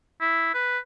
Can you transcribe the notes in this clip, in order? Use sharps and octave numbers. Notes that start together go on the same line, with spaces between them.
E4
B4